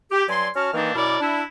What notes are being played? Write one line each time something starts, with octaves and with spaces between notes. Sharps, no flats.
G4
G2 F#3 D5 G#5 C6
C#4 F#4 A5 F6
D#3 E3 A#3 C4 D4 D#4
F#2 B2 E4 A#4 D5 D6
D4 E4